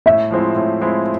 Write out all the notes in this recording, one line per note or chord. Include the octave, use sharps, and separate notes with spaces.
A2 E5
F3 G#3 C4 E4
A2
F3 G#3 C4 E4